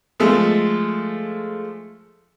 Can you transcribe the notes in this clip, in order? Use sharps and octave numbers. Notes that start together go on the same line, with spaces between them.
F3 G#3 A3